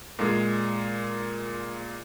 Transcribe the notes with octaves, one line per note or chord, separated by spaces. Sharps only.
A#2 G#3